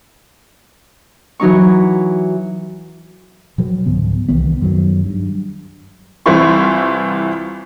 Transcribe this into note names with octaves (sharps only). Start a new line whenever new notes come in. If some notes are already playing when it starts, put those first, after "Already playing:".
E3 F#3 D#4 C#6
B2 F3 F#3
C#2 G#2 D3 B3
C2 D#3 E3 B3
F#2 D#3 F3 F#3
G2
C2 E3 C4 E4 F4 C#6